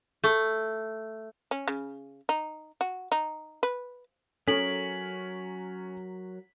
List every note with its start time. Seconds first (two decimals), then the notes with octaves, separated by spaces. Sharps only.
0.24 A3
1.51 C#4
1.68 C#3
2.29 D#4
2.81 F#4
3.12 D#4
3.63 B4
4.48 F#3 C#4 A4 A#4 C#5 B6 F#7